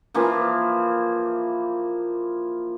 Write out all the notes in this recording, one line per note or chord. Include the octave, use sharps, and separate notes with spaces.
E3 F3 A#3